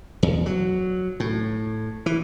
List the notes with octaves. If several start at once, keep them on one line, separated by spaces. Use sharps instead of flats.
E2
F#3
A2
E3